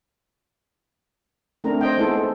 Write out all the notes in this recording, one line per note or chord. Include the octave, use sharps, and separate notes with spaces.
A3 C4 D4 A#4 A#5
C5 D#5 G5
G#3 B3 D#4 E4 A4
A4 C5